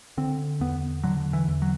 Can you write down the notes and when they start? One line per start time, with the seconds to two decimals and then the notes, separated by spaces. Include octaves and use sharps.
0.17 D3 C4
0.60 E2 B3
1.03 D3 F#3
1.33 E3
1.48 E2
1.62 F#3